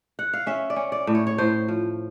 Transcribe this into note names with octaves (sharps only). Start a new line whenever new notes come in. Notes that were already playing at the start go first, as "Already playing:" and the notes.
F#5
F5
C#4 E5
D5
C#4
D5
A2
C#5
C#5
A2 C5
F3